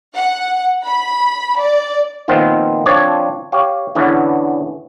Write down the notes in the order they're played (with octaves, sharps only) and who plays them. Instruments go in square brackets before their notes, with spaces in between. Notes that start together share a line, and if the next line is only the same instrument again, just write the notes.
[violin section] F#5
B5
D5
[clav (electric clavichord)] A#2 D#3 F3 B3 C4 F4
F3 C4 D4 C#5 D5
G4 C#5 F5
E2 D3 E3 B3 C#4 D4